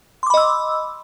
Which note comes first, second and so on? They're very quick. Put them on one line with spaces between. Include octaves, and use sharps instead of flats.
C6 D6 B5 D#5 E6